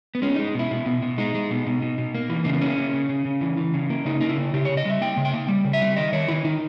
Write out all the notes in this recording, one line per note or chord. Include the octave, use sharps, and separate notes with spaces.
B3
G#3 C#4
G#3 D#4
B2 E4
B2
B2
B2
G#3 D#4
G#3
B2
B2
B2
B2
A#3
E3
C#3 A#3
B3
A#3 C#4
C#3
C#3
C#3
C#3
E3
E3
C#3
A#3
C#3 D#4
A#3 D#4
E4
C#3
C#3 G4
C#3 C#5
D#5
G3 E5
A#3 G5
C#3
G5
A#3
G3
C#3
E5
G3
D#3 D#5
D#3 C#5
D#3 E4
D#3 D#4